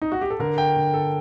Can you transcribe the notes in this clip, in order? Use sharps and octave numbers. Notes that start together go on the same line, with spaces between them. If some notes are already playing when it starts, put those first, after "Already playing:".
D#4
F#4
G4
A4
D3 A#4
G5
D3
A4